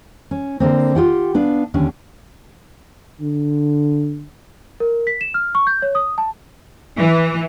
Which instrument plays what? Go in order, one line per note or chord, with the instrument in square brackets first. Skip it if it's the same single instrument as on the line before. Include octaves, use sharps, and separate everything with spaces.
[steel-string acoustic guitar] C#4
D3 A#3 C4
F4 G4 F#5
B3 D4 F5
D#2 D3 C#4 D4
[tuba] D3
[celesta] A#4
B6
E7
F6
C#6
G6
C#5
D#6
A5
[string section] E3